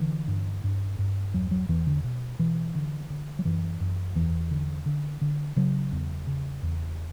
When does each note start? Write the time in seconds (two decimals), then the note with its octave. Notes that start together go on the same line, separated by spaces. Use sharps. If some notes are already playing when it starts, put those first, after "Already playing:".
Already playing: D3 E3
0.28 G2
0.64 G2
0.99 G2
1.34 E2 F#3
1.51 F#3
1.69 E2 E3
1.87 D3
2.04 B2
2.39 B2 E3
2.75 D3
3.10 D3
3.39 F#3
3.45 F#2 E3
3.80 F#2
4.15 E2 E3
4.51 D3
4.86 D3
5.21 D3
5.56 C#3 F#3
5.92 E2
6.27 C#3
6.63 E2